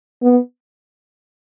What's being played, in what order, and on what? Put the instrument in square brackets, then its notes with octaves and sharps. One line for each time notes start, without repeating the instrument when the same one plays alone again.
[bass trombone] B3